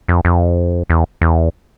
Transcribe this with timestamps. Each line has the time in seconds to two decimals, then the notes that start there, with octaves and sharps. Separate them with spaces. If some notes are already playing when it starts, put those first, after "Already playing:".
0.08 F2
0.25 F2
0.90 E2
1.21 E2